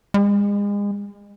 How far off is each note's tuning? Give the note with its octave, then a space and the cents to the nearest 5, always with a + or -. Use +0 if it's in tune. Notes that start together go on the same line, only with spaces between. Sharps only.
G#3 -35